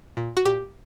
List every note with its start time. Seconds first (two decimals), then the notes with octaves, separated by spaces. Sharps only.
0.17 A#2
0.37 F#4
0.45 A#2 G4